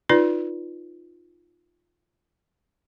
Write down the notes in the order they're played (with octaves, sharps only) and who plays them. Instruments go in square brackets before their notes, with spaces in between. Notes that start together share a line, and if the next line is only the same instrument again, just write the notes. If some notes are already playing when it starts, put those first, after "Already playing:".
[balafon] D#4 F4 B4 D5